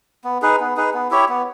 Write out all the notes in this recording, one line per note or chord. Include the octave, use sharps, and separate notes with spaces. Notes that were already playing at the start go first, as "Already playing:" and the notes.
B3
D#4 G#4 B4
B3
D#4 G#4 B4
B3
E4 G4 C#5
B3